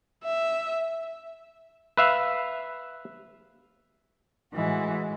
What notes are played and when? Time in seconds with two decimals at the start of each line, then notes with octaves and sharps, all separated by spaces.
0.25 E5
1.97 B4 E5 F5
4.54 A2 E3 G#3 F#4